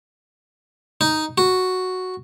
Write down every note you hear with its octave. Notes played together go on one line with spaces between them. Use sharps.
D#4
F#4